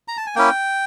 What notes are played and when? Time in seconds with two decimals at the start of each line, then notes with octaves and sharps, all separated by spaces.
0.08 A#5
0.17 A5
0.26 G#5
0.35 A#3 C#4 E4 G5